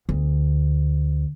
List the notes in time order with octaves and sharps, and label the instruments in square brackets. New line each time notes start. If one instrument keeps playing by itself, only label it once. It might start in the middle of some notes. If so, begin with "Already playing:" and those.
[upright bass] D2